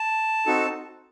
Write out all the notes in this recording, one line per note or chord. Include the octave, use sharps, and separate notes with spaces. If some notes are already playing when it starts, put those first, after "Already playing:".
Already playing: A5
C4 D#4 F#4 A4